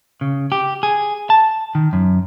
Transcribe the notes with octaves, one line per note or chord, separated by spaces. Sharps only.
C#3
G4
G#4
A5
D#3
F#2